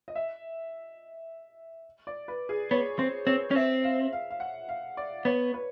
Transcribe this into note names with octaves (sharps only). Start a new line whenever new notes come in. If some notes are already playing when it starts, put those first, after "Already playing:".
D#5
E5
D5
B4
G#4
B3 C#5
C4 C5
C4 C#5
C#4
C4 E5
F5
F5
F5
F#5
F5
D5
B3 C#5
B4